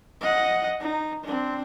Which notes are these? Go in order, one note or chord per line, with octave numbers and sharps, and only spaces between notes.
D#5 F#5
D#4
C4 D4